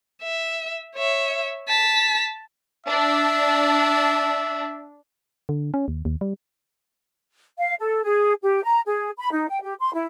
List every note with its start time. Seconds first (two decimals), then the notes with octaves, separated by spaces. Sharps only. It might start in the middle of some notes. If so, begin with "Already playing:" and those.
0.23 E5
0.96 C#5 E5
1.68 A5 B6
2.86 D4 E5
5.49 D3
5.74 C#4
5.88 D#2
6.05 D#2
6.21 G3
7.58 F5
7.80 A4
8.04 G#4
8.42 G4
8.63 A#5
8.86 G#4
9.18 B5
9.32 D#4
9.49 G5
9.63 G4
9.79 C6
9.94 E4